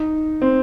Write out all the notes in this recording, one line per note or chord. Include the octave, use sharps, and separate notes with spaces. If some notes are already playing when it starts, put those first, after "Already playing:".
Already playing: D#4
C4